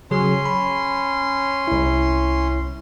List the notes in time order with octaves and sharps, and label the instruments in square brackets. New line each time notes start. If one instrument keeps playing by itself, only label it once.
[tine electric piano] C#3 F#3 G#4 [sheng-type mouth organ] C#4 C6
[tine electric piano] B5
C2 E4